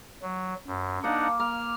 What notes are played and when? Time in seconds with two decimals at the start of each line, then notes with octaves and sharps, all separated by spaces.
0.22 F#3
0.67 F#2
1.04 A#3 D4 D#4 F5 F#5
1.40 A#3 F6